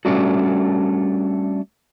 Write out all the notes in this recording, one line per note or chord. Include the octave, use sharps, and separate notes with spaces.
G3 A3 C#4 D4 F#4